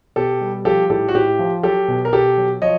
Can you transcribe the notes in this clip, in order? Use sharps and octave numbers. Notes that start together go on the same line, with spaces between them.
B2 G4 A4
G3
F3 G4 A4
A2 G4 A4
F#4
A2 G4
F3
F#3 G4 A4
B2
A#4
B2 G4 A4
F#3
F3 C#5 D#5